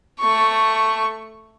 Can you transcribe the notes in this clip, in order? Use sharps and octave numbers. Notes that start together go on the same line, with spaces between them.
A3 C#6